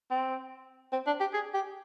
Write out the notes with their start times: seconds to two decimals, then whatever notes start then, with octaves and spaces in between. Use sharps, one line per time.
0.11 C4
0.93 C4
1.07 D4
1.20 G4
1.33 G#4
1.54 G4